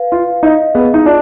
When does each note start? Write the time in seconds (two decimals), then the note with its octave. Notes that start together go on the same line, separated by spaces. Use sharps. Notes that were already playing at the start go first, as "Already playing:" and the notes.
Already playing: B4 F5
0.12 F4 F5
0.43 D#4 D#5
0.75 B3 G#4
0.94 D#4
1.06 D4 F4